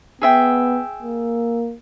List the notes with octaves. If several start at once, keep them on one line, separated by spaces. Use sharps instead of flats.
B3 G#4 E5 G5
A#3